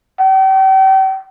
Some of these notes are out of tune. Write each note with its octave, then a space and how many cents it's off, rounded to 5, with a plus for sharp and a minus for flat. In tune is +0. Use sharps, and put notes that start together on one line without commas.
G5 -40